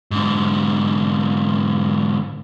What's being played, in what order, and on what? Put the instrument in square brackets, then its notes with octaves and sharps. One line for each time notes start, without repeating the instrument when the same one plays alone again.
[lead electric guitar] G#2 D3